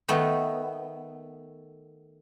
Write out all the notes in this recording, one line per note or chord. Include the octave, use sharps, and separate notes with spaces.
D#3 A3 B3